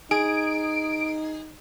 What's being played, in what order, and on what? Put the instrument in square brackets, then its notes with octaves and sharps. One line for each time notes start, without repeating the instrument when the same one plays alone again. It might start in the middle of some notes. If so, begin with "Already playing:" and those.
[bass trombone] D#4 [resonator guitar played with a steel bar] G#4 [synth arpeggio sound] D7